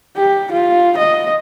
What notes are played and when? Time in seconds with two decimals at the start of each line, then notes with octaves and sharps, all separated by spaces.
0.17 G4
0.52 F4
0.98 D#5